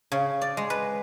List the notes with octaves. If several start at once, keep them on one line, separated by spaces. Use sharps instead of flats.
C#3
D5
G#3
B4